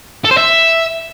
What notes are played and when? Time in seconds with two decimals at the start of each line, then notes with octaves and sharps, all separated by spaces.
0.25 A4
0.31 C5
0.37 E5